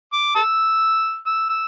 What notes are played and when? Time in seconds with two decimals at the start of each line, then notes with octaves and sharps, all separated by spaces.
0.13 D6
0.35 A5 E6
1.27 E6
1.50 E6